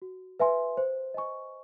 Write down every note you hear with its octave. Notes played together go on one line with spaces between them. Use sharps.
F#4
B4 E5 G#5 C6
C5
D#5 G#5 C#6